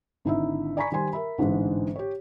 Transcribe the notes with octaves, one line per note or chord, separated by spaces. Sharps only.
G#1 D3 D#4 E4 E5
D5 G#5 A#5 B5 C#6 B6
D#3 G3 C5 G#5 C6
A#4 E5 B5
A1 G#2 D3 E3 G#3
G4 C#5